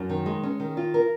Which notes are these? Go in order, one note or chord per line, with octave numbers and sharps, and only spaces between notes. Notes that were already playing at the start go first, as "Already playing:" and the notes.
Already playing: F#2
D#3
G#3
C#4
D#3
F4
A#4